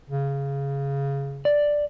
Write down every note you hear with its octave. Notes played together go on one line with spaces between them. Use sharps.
C#3
D5